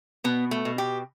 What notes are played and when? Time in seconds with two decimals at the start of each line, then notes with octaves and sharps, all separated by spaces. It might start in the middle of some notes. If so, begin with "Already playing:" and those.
0.24 B2 B3
0.51 A3
0.65 B2
0.78 G4